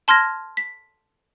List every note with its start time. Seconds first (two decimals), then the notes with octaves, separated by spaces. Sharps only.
0.08 A5 C6 F6 G#6 A#6
0.57 B6